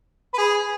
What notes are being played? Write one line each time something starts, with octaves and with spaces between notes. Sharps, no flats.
B4
G#4